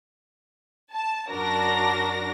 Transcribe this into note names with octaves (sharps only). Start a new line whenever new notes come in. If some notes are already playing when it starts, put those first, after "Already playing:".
A5
F#2 D4 F#4 A#4 A#6